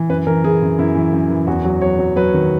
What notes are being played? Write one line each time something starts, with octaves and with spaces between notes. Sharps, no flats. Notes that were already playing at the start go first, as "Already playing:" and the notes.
Already playing: E3
F#2 B4
E3 A#4
E3 G#4
F#2
F#2 E4
E3
F#2
E3
E2 F#4
F#3
F#3 C#5
F#3
F#3 B4
D#3